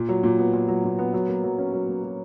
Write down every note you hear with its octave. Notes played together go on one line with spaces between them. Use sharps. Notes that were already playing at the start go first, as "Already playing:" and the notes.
Already playing: A#2
F#3
A#2
B3
A#2
F#3
A#2
B3
F#3
A#3
F#3
C#4
F#3
A#3
F#3